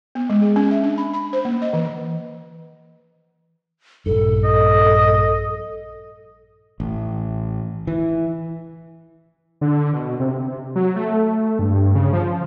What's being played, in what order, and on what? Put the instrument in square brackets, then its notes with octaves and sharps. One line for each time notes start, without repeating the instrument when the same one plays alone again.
[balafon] B3
G#3
G#4
C#4
E5
D4
B5
B5
C5
A#3
D#5
E3
[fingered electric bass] A#1 G2 [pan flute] A4
[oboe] D#5
[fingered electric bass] A1
E3
[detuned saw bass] D3
B2
C3
F#3
A3
G2
C#3
F3